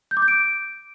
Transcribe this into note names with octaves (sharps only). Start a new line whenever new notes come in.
G6
D6
G6
D7